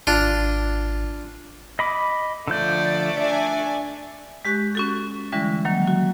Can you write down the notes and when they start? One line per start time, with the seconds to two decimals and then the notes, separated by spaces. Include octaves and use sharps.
0.07 G#1 D4 F4
1.79 D#5 B5 D6
2.48 D3 F3 A3 D5 G6
3.17 D4 E5 G#5
4.45 G#3 G4 C#6 F#6
4.75 C#4 F#4 A4
5.32 D3 E3 G3 G#3 C#4 E4
5.65 D#3 F#3 A#3
5.88 F#4